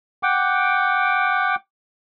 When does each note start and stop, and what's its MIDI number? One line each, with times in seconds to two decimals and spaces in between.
0.23 1.55 78
0.23 1.55 79
0.23 1.55 86